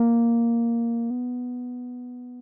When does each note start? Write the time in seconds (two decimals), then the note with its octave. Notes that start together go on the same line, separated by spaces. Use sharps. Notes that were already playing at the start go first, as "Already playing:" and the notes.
Already playing: A#3
1.10 B3